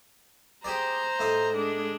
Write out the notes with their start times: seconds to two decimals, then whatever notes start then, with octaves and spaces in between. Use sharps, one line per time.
0.64 G4 G#4 C5 D5 A#5
1.19 A2 D#4 D#6
1.54 G#3 D4